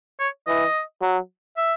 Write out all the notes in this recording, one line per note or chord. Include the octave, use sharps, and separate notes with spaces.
C#5
E3 D#5
F#3
E5